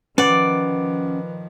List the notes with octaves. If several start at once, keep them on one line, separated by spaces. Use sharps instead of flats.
D#3 F3 C#4 B4 D5 F#5